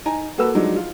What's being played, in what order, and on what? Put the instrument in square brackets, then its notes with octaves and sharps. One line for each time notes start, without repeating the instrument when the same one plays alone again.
[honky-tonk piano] D#4 G#5 A#5
A#3 F#4 A4 B4 E6
F3 F#3 G#3 D4 D#4
F4